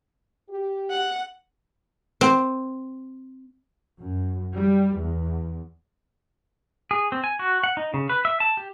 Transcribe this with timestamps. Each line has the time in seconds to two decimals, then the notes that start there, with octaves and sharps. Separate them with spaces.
0.50 G4
0.90 F#5
2.21 C4
4.00 F#2
4.54 G3
4.97 E2
6.91 G#4
7.12 C4
7.24 G#5
7.39 F#4
7.64 F#5
7.77 D#4
7.94 C#3
8.09 B4
8.25 E5
8.40 A5
8.57 G4